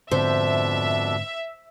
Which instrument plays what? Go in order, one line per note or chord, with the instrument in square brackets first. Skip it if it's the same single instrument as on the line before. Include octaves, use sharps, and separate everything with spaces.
[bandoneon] F2 B2 D4 [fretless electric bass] G#2 D3 C4 [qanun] C5 [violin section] E5